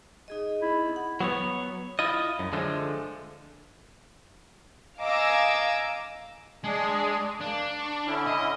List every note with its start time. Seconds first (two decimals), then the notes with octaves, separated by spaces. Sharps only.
0.28 D#4 G#4 D#5
0.62 E4
0.96 F#5
1.20 F#3 B3 C#5
1.99 E4 F4 D#5
2.39 F#2
2.53 D3 F3 G#3 A3
4.99 D#5 F5 G#5 A#5 D6 E6
6.64 G#3 D4 G#4
7.41 A#3 D4
7.79 C#6
8.06 D3 C#4 E4
8.27 D#5